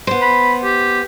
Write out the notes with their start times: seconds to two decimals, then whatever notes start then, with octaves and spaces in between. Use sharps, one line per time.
0.07 B3 C5
0.22 B5
0.64 G4